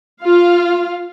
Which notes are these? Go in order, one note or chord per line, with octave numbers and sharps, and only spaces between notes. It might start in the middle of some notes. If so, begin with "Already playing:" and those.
F4 F5